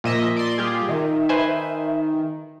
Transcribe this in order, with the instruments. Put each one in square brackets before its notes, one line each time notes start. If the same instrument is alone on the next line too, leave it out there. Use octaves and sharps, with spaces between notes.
[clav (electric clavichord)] A#2 [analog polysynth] F3 D#5 E5
[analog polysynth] D5 C6
[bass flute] G3 [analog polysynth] F4 G4 G#4
[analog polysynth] D#3 [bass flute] E5
[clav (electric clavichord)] B4 C5 G#5